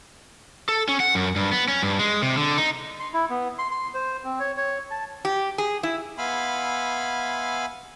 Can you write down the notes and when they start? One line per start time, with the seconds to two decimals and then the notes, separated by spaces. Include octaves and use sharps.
0.69 A4
0.88 C#4
1.00 F#5
1.15 F#2
1.36 G2
1.52 B3
1.68 C#4
1.83 G2
1.99 G#3
2.22 C3
2.37 D3
2.58 D#4
3.00 C6
3.14 E4
3.30 B3
3.58 C6
3.71 C6
3.94 C5
4.25 C4
4.40 C#5
4.57 C#5
4.91 A5
5.25 G4
5.58 G#4
5.83 E4
6.18 B3 E5 F5 G#5 B5 C6